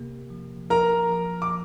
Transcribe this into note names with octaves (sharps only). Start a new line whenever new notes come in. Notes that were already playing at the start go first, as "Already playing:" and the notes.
Already playing: C3 A#3 G4
F3
F3 A#4 A#5
F3
D6